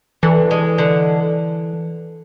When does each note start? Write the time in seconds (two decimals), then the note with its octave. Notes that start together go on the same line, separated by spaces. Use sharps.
0.23 D3 E3
0.51 G#3
0.78 D3